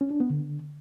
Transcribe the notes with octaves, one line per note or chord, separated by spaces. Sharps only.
C#4
D4
B3
D3